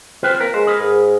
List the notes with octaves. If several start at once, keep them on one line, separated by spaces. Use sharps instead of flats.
C4 F4 B4 C5
A#3 A#4 B4
G#3 C5
G#4 A#4 B4
G#2